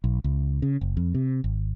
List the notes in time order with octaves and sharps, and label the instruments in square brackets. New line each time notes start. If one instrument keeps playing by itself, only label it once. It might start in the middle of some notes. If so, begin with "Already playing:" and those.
[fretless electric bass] B1
C#2
C#3
F#1
F2
C3
G#1